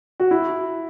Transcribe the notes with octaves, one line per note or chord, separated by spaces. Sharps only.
F#4
E4